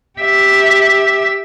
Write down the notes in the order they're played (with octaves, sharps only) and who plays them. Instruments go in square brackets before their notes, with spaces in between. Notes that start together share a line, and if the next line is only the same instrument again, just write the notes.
[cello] G4 E5